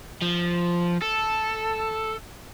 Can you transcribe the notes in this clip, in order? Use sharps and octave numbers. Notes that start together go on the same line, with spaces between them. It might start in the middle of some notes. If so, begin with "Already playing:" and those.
F3
A4